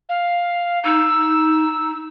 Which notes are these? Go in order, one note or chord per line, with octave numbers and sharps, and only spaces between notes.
F5
D#4 E6